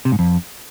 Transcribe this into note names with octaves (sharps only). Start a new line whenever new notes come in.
C3
G#2
F2